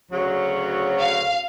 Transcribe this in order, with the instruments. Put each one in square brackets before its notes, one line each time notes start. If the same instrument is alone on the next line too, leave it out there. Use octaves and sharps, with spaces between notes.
[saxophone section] D2 C#3 F#3
[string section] F5